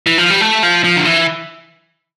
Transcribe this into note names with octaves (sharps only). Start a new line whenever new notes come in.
E3
F3
G3
A3
F3
F3
D3
E3